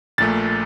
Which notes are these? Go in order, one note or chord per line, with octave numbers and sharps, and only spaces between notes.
A#1 A#2 A3 A6